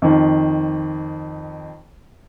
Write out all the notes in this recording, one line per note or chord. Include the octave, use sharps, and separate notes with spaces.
F2 D#3